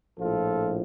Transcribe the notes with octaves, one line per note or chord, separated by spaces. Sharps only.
A#1 A2 F3 F4 A4